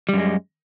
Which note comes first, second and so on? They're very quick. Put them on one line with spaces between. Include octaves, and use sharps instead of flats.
G3 F#2 G#3